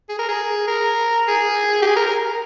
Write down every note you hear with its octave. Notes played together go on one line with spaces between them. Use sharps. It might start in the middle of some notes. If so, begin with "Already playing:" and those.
G#4
A#4
G#4
A#4
G#4
G4
G#4
A#4
A#4